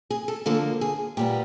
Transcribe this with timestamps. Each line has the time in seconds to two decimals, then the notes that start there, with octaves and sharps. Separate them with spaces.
0.10 G#4
0.28 A4
0.46 D3 F3 A#3 A4
0.81 G#4
1.17 A#2 G3 B3 G4